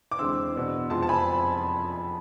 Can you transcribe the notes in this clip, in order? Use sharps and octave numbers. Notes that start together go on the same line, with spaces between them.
D6
E2 D3 G#3 C4 C6 E6
E2 B2 B3 D4
F2 C3 F3 G#3 C4 A5 C6
A5
G#5 B5